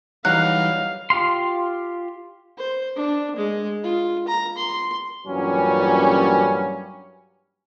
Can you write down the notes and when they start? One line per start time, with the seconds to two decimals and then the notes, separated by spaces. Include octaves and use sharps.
0.25 E3 F#3 G3 D#4 F5 F#6
1.10 F4 G4 F5 C6
2.58 C5
2.97 D4
3.37 G#3
3.84 F4
4.28 A#5
4.57 C6
5.26 G2 A#2 E3 F#3 G3 C#4